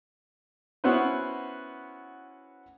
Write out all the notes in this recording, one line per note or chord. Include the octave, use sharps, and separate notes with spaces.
B3 C#4 E4 F#4 B4 C5